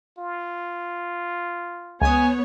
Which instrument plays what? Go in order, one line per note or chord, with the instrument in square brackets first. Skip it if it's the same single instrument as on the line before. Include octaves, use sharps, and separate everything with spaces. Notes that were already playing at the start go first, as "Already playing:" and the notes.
[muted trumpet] F4
[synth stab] C#2 D#6 [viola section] B3 C#5 [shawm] G#5